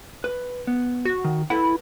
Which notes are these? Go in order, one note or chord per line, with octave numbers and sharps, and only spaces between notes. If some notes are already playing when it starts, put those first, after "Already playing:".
B4
B3
F#4
D#3
E4 A4 B4 F#5